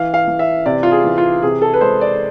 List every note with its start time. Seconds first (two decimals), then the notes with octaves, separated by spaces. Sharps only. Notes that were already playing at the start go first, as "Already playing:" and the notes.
Already playing: E3 F5
0.14 F5
0.28 E3
0.39 E5
0.66 C3 D5
0.83 F4
0.91 G#4
1.04 E3
1.18 F4
1.42 C3 G#4
1.62 A4
1.74 B4
1.81 G#3 C5
2.01 D5